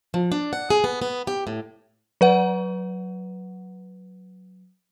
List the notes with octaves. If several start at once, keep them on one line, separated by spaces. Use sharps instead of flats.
F3
D4
F#5
G#4
B3
B3
G4
A2
F#3 B4 F#5